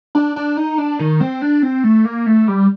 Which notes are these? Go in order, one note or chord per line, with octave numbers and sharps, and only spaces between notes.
D4
D4
D#4
D4
D#3
C4
D4
C4
A3
A#3
A3
G3